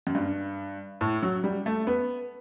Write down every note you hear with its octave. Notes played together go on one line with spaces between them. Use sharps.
F#2
G2
A2
F#3
G3
A3
B3